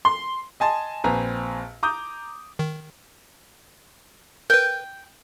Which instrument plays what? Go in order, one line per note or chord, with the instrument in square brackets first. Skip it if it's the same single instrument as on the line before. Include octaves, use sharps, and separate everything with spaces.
[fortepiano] C6
[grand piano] D#5 G#5 A5 C6
A#1 C4 B4 G#5 A#5
A#5 D6 D#6 G6
[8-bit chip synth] D#3
[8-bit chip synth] A#4 B4 [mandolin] G5